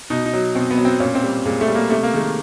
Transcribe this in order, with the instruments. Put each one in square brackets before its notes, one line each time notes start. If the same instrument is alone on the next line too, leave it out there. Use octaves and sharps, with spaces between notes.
[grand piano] B2 D#4
D#4
F#3
B2 C4
B3
F#3
C4
A#2 C#4
C4
G3
A#2 G#3
A3
G3
A#3
C3 A3
A#3
D#3 G#3 A3